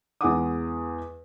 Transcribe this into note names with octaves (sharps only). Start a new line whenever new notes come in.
E2 G#3 E4 F#5 D6 D#6